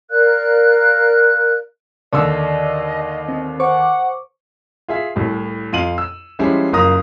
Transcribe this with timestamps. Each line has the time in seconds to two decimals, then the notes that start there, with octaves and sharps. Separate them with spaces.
0.10 A#4 D5 F5 F#6
2.13 D#2 D3 D5 D#5 E6
3.29 C4
3.60 C5 F#5 C#6 D6
4.88 F4 G#4 E5
5.16 C2 A2
5.73 F2 F4 D#7 F#7
5.98 E6
6.39 F3 G3 G#3 C#4 E4
6.73 F#1 A#3 F4 A#5 D#6 A#6